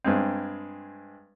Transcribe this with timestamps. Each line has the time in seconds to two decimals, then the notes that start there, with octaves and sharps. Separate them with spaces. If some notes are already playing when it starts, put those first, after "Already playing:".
0.04 G2 G#3 C4